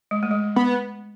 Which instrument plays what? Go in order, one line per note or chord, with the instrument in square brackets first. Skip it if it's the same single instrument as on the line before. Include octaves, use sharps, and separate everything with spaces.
[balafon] G#3
A3
G#3
[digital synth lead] B3